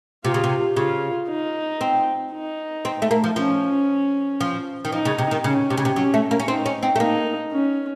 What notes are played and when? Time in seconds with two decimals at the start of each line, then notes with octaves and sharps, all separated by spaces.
0.25 C3 F4
0.34 C#3
0.44 C3
0.76 C#3 F4
1.29 D#4
1.81 C4
2.33 D#4
2.85 C4
3.02 A3
3.11 A#3
3.24 F3
3.36 F3 C#4
4.41 F3
4.85 D#3
4.92 F3 D#4
5.05 C#3
5.18 C3
5.31 D#3
5.44 C#3 C#4
5.70 C3
5.77 C#3
5.85 C3
5.96 F#3 C#4
6.14 A3
6.31 A#3
6.40 C#4
6.48 C4 D#4
6.66 C#4
6.83 C4
6.96 A3
7.00 A#3 D#4
7.52 C#4